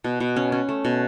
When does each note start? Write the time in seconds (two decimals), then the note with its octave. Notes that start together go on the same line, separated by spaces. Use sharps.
0.04 B2
0.20 B2
0.36 C#4
0.52 C#4
0.69 A3
0.85 B2